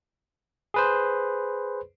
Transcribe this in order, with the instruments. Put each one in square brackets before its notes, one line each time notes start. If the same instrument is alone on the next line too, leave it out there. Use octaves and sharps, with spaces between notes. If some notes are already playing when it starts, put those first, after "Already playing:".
[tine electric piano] G#4 B4 C5